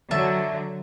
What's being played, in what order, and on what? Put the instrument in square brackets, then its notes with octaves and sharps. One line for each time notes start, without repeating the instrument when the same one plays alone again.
[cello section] D3 F#3 [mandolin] E5 A5